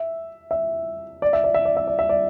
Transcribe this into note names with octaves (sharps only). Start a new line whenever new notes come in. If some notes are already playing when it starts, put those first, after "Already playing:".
Already playing: E5
E5
D5
E5
D5
E5
D5
E5
D5
E5
D5